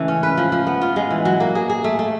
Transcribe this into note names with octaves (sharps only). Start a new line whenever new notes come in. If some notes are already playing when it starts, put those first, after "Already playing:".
Already playing: C#3 E3 G#3 A3
C#4
B4
F3
F3
B3
F4
G#3
E3
F#3
A#3
G#4
G#4
A3
A3